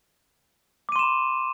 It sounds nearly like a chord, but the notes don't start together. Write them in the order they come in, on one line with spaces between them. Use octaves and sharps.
D6 D#7 C6 E7 B5